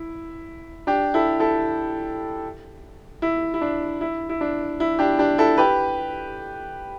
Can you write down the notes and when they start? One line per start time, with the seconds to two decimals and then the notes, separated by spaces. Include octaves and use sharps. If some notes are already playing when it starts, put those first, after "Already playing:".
Already playing: E4
0.87 D4 G4
1.14 E4 A4
1.40 E4 A4
3.22 E4
3.54 E4
3.61 D4
4.01 E4
4.29 E4
4.41 D4
4.80 E4
4.99 D4 G4
5.19 D4 G4
5.38 E4 A4
5.58 G4 B4